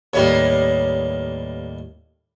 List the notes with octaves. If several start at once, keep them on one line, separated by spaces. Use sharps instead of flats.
D#2 A2 G3 A#3 B3 C#5